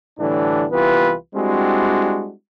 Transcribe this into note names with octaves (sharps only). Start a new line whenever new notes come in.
A2 D3 E3 G3 D4
C2 E3 B3 F4 G4 B4
G3 G#3 C4 D4 E4 F#4